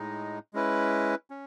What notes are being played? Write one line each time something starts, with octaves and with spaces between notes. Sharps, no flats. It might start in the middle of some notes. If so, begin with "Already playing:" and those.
Already playing: A2 G#3 D#4
G#3 C#4 E4 B4
C#4